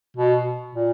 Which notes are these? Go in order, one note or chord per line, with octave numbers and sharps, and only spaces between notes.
B2
A#2